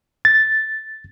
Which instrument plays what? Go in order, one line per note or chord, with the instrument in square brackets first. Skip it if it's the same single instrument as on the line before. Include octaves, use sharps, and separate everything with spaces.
[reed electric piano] A6